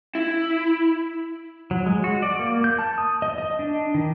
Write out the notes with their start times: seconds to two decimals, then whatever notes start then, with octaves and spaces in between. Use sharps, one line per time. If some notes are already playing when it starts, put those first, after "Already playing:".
0.15 E4
1.71 F#3
1.86 G#3
2.04 F#4
2.23 D5
2.39 A#3
2.64 G6
2.79 A5
2.98 D#6
3.22 D#5
3.38 D#5
3.59 D4
3.95 D#3